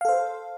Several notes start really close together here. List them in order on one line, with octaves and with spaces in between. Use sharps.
F5 A4 C5